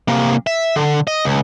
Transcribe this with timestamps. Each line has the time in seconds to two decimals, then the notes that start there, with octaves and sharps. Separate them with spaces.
0.08 C3 A#3
0.47 E5
0.76 D3
1.07 D#5
1.25 C#2